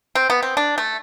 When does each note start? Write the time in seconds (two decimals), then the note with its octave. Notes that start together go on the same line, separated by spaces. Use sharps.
0.15 C4
0.30 B3
0.43 C4
0.57 D4
0.78 A3